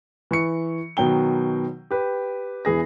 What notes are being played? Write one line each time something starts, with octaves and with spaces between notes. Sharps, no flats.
E3 C#6 C#7
B2 D#3 F#3 G5 G7
G4 B4
E1 E3 G#4 A#6